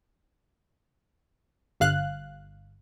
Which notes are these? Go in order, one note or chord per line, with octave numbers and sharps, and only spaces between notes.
G1 F5 F#6